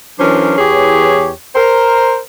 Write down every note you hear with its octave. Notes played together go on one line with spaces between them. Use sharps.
E3 F#3 C#4 D4 A#4 C5
E2 E3 G4 G#4 C#5
A#4 C5